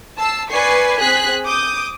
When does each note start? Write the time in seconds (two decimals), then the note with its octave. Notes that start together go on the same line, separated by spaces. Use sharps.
0.19 A5 E6 C7
0.50 B4 D5 G#5 C#6 C7
1.00 C4 G#4 F#6 B6
1.47 D6 D#6 G6